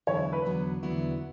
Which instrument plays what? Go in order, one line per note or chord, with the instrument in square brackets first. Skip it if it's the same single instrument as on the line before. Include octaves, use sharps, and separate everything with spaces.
[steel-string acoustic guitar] E2 D3 F#3 B3 E4 [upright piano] C#5
[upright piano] B4
[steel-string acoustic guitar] E2 D3 F#3 B3 E4
E2 D3 F#3 B3 E4